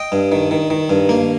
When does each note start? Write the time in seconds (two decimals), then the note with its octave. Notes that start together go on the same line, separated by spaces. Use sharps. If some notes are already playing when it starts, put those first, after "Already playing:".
Already playing: D#5 G5
0.12 G2
0.32 D#3
0.51 D#3
0.70 D#3
0.89 G2
1.09 A#3